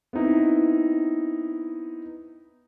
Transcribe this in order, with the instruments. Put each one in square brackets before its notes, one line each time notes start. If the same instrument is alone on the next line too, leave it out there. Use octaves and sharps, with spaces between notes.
[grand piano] B3 C4 D#4 E4